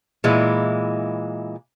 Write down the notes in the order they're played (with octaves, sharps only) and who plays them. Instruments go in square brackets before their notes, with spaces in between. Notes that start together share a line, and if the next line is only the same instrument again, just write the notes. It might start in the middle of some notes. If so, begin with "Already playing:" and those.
[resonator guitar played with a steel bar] A#2 E3 G#3 E4